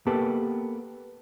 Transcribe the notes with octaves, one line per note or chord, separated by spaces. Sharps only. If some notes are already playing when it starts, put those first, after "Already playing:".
A#3 B3 G4 A4